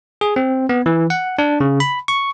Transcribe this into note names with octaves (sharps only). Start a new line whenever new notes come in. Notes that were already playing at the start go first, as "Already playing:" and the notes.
G#4
C4
B3
E3
F#5
D4
C#3
B5
C#6